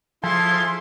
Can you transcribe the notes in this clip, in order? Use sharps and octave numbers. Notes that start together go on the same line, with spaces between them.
F3 E4 G#4 A4 F5 C6